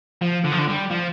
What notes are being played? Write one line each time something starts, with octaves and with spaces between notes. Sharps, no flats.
F3
D3
F3
D3
G3
F3